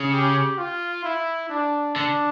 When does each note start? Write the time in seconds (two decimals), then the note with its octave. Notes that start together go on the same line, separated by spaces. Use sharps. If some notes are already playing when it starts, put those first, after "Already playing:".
Already playing: C#3
0.12 G4
0.58 F4
1.04 E4
1.50 D4
1.96 D3 D4